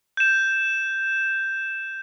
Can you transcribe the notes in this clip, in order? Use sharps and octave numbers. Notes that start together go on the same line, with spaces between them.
G6 E7